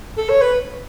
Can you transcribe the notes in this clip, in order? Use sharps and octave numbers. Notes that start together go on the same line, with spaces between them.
A4
C#5
B4